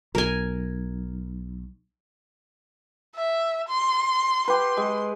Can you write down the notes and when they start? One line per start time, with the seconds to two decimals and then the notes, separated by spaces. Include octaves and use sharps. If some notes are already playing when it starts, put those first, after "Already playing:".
0.15 B1 A#4 G#5
3.15 E5
3.68 C6
4.48 G4 B4 C6
4.77 G#3